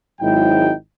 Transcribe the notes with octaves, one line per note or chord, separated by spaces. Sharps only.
G#1 G#2 F#3 D#4 E4 G5